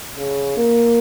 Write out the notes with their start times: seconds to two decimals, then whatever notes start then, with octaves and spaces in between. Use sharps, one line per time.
0.16 C#3
0.57 A#3